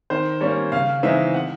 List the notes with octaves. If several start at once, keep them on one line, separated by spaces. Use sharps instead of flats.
D#3 C5
G3 A#3 C#4 C#5
C#3 F5
E3 G#3 C4 D#4 E5
F#5